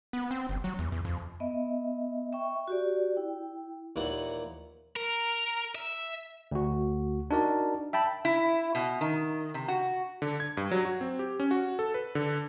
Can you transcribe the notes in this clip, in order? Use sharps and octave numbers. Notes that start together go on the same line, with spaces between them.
B3
C4
G1
F#3
E2
E2
F2
B3 D#5 E5
E5 G5 C#6
F#4 G4 D5
E4 G5
D#2 A#2 E3 F#5
A#4
E5
D2 F#4
D4 D#4 F#4 A#4 D5
E5 G5 A5 B5
E4
B2
D#3
C3
F#4
D3
G#6
G2
F#3
F#4
C4
G4
C#4
F#4
A4
B4
D3